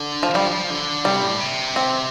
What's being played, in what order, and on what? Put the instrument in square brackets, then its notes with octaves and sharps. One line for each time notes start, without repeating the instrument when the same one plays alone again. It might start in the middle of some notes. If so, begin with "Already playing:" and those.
Already playing: [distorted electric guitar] D3
[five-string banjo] F3
[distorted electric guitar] F3 [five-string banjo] G3
[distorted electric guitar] F3
D3
[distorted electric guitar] C3 [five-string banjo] G3
[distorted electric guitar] A2
C3
[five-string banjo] C4